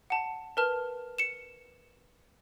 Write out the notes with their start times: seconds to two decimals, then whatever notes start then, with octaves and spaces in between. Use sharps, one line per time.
0.10 F#5 A5
0.57 A#4 B4 A5 F6
1.18 C#7 E7